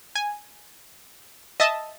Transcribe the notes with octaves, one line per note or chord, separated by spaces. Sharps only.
G#5
D#5 E5 A5 D#6